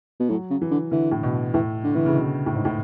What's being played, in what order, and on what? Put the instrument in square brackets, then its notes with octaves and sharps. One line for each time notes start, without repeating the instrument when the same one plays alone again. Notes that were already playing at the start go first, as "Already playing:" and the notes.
[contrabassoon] B2
[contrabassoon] A2 [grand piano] F#3
[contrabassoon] C#3
[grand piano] E3
[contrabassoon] D3
[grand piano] D3 [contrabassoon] E3
[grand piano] A2
B2
[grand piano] A2 [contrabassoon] E3
[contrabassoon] D3
[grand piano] D3 [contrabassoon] E3
[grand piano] C#3
B2
A2
G#2
A2